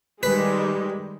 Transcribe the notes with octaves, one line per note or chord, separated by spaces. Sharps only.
D#3 G3 G#3 B4